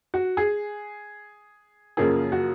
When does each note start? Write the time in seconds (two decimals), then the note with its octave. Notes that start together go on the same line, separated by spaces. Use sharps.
0.14 F#4
0.37 G#4
1.97 F#2 C#3 F3 A#3 G#4
2.32 F#4